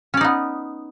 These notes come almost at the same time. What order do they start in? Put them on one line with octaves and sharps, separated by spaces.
C#4 D5 D#4 B3